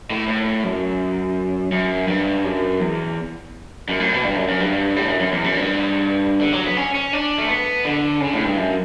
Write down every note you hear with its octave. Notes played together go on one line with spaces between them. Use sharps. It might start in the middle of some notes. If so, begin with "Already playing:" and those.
A2
A2
F#2
F#2
G2
F#2
E2
F#2
A2
B2
G2
F#2
F#2
G2
A2
F#2
F#2
E2
F#2
G2
D3
F#3
B3
C#4
C#4
D4
A3
B3
D3
C#3
A2
G2
F#2